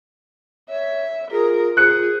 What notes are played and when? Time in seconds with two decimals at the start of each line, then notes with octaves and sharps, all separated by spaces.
0.69 C#5 E5
1.31 F4 G#4 A#4
1.77 G#4 C5 F#6 C#7